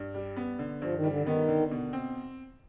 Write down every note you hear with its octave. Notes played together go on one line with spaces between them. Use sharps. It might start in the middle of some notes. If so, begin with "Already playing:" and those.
Already playing: G2
G3
B3
D3
G2 F3
D#3
G3
D3
D#3 B3
D3
B2
C4